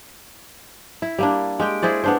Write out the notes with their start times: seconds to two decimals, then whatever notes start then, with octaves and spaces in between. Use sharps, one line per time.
1.02 E4
1.19 G3 A#3 D4
1.60 G#3 G4 G5
1.82 E4 G#4 C5 D5
2.04 B3 D4 C5